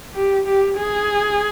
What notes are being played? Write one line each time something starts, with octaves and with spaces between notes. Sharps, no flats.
G4
G4
G#4